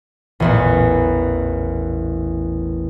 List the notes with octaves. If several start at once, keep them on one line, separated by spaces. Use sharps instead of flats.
A1 E2 A#2